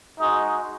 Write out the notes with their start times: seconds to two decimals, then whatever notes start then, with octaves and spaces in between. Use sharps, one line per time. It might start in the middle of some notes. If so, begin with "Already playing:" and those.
0.18 G#3 D#4 F#4 D#5